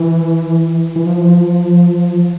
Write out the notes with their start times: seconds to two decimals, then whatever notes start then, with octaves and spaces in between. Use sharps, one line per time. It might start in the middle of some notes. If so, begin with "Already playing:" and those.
Already playing: E3
0.96 E3
1.05 F3